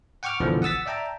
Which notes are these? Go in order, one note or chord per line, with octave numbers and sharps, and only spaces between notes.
F#5 G5 C#6 D6 F6
G1 C2 B2 D3 E3 F3
F#5 D#6 E6 A6 B6
D5 E5 G5 A5 A#5